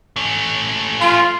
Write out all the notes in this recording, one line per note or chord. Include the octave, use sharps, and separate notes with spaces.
A3 C#4
F4